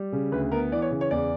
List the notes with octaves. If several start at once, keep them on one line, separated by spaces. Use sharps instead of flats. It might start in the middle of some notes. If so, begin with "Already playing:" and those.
Already playing: G3
C#3
D2 B4
B3 A#4
E3 D5
C#5
C#3
C#5
E2 D5